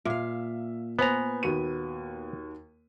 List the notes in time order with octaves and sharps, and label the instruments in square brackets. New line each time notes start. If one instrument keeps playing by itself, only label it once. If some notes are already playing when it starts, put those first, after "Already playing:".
[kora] A#2 F5 [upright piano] E5
[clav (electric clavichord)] B3 A#5 [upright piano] B4 C5 G#5
[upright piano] D#2 F#4 D#7